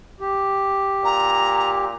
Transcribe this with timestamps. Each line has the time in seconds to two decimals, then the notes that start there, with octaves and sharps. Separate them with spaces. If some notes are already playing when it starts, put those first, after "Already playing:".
0.20 G4
1.04 A#2 A#5